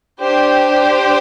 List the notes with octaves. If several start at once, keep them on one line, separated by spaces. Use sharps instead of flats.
D4 G4 C5